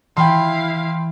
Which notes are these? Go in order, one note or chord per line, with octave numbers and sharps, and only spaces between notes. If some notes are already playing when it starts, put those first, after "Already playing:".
E3 E4 F5 G5 B5 C6